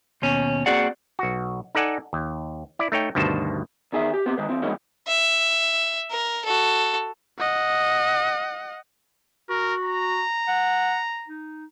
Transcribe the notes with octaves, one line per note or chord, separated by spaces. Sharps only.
D#2 B2 C#4
A#3 C4 F#4 G#4 D5 F#5
B1 F#4
D#4 A4 D5 F#5 G#5
D#2
E4 D5
A3 D#4 C#5 G5
D2 G2 B2 D#3 C5 A5
E2 D#3 G#4 D#5 E5
G4
B3 C4 G4
D#3 G#3 B4
E3 C4
G2 E3 G#3 A#3 C#4 D#4
E5
A#4
F#4 A4
D#5 F#5
F#4 A#4
A#5
F#5
D#4